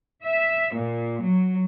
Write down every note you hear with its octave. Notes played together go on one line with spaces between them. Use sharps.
E5
A#2
F#3